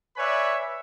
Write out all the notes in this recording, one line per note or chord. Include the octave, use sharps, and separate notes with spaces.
B4 C#5 D5 E5 G#5 B5